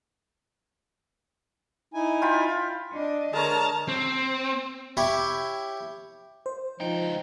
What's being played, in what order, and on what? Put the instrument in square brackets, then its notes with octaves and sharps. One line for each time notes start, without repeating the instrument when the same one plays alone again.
[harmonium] D#4 E4 G#5
[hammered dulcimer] F4 G5 B5
[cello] D4 D#5
[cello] D3 [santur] G#3 A#4 C#5 [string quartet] A5 A#5 F6
[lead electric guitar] C4
[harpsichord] E4 G4 C#5
[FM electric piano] C5
[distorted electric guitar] C#2 G5 [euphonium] F3 [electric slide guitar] D#4